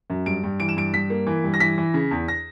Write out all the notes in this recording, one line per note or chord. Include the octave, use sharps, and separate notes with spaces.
F#2
G2 D7
G2
E3 D7
E7
G2 D7
G2 B6
A#3
E3
G2
A#6
E3 B6
E3
C#3
E2
A#6